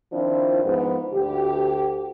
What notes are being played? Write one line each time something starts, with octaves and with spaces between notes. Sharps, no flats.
D#3 F3 C4 D4 E4 F4
G#2 F3 B3
D2 G4